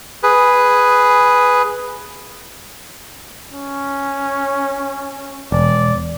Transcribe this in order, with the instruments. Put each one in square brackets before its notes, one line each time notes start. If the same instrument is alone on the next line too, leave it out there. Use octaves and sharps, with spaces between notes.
[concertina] G#4 B4
[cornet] C#4
[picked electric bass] E1 [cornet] D5